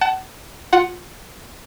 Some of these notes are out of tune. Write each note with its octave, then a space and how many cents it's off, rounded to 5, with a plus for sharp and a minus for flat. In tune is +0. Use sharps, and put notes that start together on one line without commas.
F#5 +35 A5 +0
F4 +20 F#5 +0